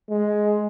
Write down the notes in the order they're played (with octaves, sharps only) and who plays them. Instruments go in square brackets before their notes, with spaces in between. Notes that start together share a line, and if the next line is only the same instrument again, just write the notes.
[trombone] G#3